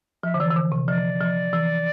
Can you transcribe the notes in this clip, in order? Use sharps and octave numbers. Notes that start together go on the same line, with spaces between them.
F3 E5
D3
E3 D5
E3
D3
C3
F3 D5
F3
E3